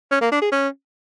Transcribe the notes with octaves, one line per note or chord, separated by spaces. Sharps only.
C#4
A#3
D4
G#4
C#4